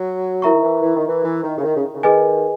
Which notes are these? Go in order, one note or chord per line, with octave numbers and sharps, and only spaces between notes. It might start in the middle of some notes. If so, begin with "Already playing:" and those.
Already playing: F#3
E3 E4 A#4 E5 A#5 C#6
D#3
E3
E3
D#3
E3
E3
D#3
C#3
D#3
C#3
D#3
C#3
D#3 G#4 B4 D#5 G#5